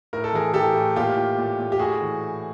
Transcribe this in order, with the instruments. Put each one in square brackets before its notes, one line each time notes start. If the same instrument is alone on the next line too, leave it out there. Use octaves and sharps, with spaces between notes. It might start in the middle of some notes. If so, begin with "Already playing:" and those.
[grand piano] A2 A#4
A4
E3 G#4 A#4
E3 G4 A4
A2
A#2 F4 G4
A#2
A#2
A#2
G4
A2 F#4 G#4
E3